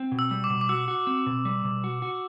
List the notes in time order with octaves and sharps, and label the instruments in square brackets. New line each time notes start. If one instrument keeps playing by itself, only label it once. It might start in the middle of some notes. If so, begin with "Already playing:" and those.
Already playing: [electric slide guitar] C4
B2
[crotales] E6
[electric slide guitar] G3
[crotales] D6
[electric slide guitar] B2
[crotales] D6
[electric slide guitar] F#4 [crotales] E6
[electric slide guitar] F#4
C4
B2
G3
B2
F#4
F#4